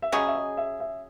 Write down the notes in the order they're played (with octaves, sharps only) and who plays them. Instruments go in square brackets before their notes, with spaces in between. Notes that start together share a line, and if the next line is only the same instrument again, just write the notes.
[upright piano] E5
[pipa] C#3 F#3 C#4 G#4 [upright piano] D#5
[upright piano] E5
D#5
E5
E5